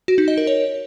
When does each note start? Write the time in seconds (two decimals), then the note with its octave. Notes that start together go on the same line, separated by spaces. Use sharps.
0.08 F#4
0.18 D#4
0.28 D#5
0.38 A#4
0.47 C#5